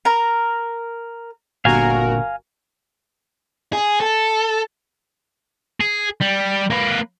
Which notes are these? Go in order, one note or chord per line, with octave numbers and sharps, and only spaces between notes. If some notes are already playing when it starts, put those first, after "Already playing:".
A#4 A#5
G1 A#2 D3 F#4 A#4 F5 G#5 A#5
G#4
A4
G#4
G3
A#3 B4